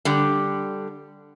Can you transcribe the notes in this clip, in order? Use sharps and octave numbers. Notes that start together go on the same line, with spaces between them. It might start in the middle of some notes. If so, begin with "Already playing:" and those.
D3 G3